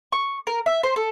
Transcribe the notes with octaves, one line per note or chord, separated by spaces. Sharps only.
C#6
A#4
E5
C5
A4